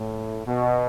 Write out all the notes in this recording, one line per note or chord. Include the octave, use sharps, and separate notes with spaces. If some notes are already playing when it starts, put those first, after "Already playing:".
Already playing: A2
B2